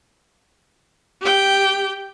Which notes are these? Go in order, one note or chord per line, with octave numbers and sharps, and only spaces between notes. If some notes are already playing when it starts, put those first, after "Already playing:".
G4 G5